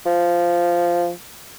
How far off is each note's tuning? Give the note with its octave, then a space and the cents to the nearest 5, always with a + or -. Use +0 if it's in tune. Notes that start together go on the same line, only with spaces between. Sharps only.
F3 -10